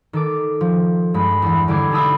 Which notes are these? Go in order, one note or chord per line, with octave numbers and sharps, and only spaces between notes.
D#3 A4 D6
F3
G2 G#3 B5
E2 E3
D3 G3 E4 D6 G#6 C7
B2 D#4 A5 B5 D#6 E6